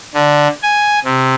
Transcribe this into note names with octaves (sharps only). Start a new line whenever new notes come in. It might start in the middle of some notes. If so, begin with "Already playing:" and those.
D3
G#5
C3